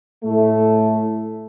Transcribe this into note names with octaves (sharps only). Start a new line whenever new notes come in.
A2 A3